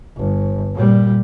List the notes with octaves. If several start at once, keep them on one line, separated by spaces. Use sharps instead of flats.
G1
A#2 G3